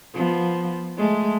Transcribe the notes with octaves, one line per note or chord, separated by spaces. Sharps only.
F3 B3
G#3 A3